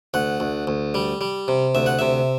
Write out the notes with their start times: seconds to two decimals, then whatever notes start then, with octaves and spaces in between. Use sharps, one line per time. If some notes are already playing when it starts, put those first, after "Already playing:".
0.14 D2 F#5
0.40 D2
0.67 D2
0.94 G3
1.21 G3
1.48 C3
1.75 D2 E5
1.86 F#5
1.99 C3 E5